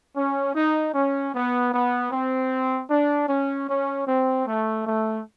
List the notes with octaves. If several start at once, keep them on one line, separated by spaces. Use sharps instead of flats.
C#4
D#4
C#4
B3
B3
C4
D4
C#4
C#4
C4
A3
A3